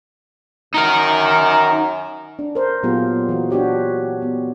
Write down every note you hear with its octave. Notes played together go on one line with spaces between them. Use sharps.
F#2 D#4 A#4
D4
A#4 C5
A#2 F#3 B3 F4 G4 G#4
E3 F#4
D4 F#4 G4 C#5
B3